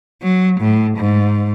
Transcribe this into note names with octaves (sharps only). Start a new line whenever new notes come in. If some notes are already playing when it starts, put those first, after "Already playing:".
F#3
A2
G#2